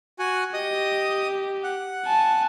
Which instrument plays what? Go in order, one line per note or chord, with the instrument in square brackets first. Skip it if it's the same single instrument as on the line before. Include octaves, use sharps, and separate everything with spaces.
[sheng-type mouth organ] F#4 F#5 G#5
[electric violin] G4 [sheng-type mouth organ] D#5 D#6
[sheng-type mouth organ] F#5
[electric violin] G#5 A5